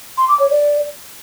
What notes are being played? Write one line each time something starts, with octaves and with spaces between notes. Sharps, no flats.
C6
D6
C#5
D5